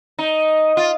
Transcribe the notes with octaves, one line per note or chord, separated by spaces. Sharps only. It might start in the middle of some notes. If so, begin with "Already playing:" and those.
D#4
F4